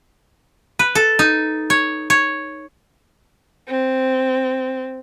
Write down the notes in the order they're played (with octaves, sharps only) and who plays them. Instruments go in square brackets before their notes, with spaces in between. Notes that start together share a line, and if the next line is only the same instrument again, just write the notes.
[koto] B4
A4
D#4
C#5
C#5
[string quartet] C4